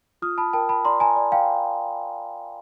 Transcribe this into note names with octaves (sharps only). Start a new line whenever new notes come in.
F4 D#6 F6
A5 B5
A#4 G5 A5
A5 B5
D5 A#5 C6
G#5 A#5
D5
F5 G5